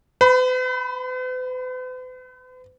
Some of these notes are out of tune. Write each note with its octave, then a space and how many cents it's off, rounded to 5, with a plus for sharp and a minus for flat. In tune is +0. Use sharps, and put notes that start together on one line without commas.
B4 +45 B5 +0